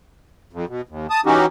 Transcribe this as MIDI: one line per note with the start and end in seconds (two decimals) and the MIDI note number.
0.53 0.65 41
0.69 0.81 47
0.89 1.07 39
1.10 1.21 81
1.10 1.21 87
1.26 1.46 52
1.26 1.46 61
1.26 1.46 63
1.26 1.46 66
1.26 1.46 67